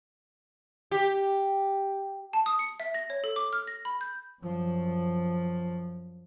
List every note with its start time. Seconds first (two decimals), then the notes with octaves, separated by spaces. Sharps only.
0.91 G4
2.33 A5
2.46 D#6
2.59 C#7
2.80 E5
2.94 A#6
3.10 C#5
3.24 A4
3.36 D6
3.53 F6
3.67 A#6
3.85 B5
4.01 G6
4.42 F#2 F3